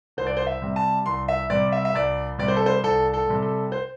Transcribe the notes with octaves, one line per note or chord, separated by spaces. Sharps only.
C2 C5
D5
C5
E5
C3 G3
A5
C2 C6
E5
C3 G3 D5
E5
E5
C2 D5
C3 G3 D5
C5
A4
C5
C2 A4
A4
C3 G3
A4
C5